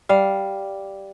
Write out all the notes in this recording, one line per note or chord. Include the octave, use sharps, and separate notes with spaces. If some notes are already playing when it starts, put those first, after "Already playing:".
G3 F5